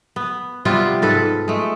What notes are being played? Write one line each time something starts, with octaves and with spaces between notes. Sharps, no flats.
B3
C3 G3 B3 F4
G#2 A4 B4
G#3 A3